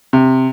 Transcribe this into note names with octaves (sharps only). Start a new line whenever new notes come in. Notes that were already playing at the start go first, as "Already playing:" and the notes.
C3